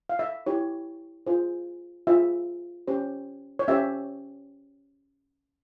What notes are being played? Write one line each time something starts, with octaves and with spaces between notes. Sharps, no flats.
F5
E5
E4 G4 C#5
F4 G#4 C5
F4 G#4 C5 E5
C#4 G4 C5
C#5
C#4 G4 C5 E5